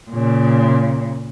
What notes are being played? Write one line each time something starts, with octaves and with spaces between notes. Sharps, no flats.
A#2 C#3